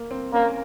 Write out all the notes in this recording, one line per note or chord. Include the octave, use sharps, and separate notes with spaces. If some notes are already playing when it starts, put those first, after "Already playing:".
Already playing: A#3
C4
A#3 C#4